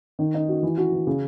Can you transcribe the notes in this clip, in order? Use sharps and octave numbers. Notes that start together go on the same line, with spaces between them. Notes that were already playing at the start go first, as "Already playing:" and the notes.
D#3
D#4
F#4
E3
F#4
E3
C#3